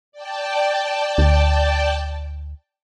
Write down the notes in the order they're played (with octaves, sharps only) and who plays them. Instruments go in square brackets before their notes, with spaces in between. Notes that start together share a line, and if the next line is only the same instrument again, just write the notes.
[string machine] D5 G5 A5
[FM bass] D2